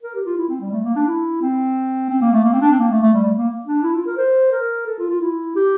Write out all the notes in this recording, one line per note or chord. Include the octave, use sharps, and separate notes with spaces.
A#4
G4
F4
E4
C4
G3
A3
A#3
D4
E4
C4
C4
A#3
A3
A#3
C4
D4
C4
A#3
A3
A3
G3
A3
A#3
D4
E4
F4
A#4
C5
A#4
A4
F4
F4
E4
G4